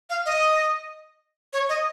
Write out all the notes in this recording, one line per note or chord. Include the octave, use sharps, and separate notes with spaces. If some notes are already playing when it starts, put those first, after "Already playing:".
F5
D#5
C#5
D#5